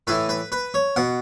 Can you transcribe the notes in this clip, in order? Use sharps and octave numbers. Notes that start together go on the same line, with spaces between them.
A2 E3 B4
B4
B4
C#5
B2 F#5